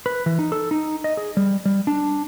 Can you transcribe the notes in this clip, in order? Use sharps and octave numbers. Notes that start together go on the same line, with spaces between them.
B4
E3
D#4
A4
D#4
D#5
G#4
G3
G3
D4